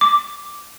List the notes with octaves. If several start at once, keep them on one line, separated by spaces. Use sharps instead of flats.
D6